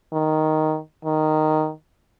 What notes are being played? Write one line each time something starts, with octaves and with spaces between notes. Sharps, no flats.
D#3
D#3